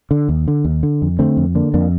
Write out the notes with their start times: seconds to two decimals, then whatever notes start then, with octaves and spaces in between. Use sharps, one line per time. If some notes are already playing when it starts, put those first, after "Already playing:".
0.11 D3
0.29 D#2
0.48 D3
0.64 D#2
0.83 D3
1.02 F2
1.19 D3 A3 C4
1.37 F2
1.55 D3 A#3 D4
1.74 F2 A#3 D4